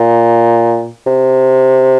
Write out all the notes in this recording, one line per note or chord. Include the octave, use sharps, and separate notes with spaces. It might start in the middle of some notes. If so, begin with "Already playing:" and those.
Already playing: A#2
C3